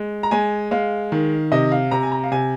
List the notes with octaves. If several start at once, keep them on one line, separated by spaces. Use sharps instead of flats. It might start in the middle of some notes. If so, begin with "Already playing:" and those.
Already playing: G#3
A#5
G#3 G#5
G#3 F5
D#3
C3 D#5
F5
C3 A#5
G#5
A#5
F5
C3 G#5